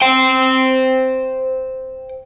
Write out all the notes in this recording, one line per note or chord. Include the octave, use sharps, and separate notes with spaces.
C5 G5